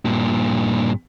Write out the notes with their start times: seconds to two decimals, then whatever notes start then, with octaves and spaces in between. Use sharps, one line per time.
0.05 G2 A#2